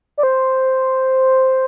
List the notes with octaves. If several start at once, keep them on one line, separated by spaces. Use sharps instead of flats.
D5
C5